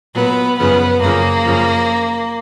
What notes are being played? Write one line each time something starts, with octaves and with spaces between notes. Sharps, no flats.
A#2 F#3 B3
F#2 C#3 F3 B3
F#2 C#3 F3 A#3
F#2 C#3 F3